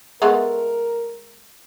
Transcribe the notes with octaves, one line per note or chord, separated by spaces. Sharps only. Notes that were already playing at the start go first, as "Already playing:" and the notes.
G#3 A3 B3 A#4